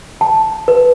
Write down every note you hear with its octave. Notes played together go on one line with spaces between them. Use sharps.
A5
B4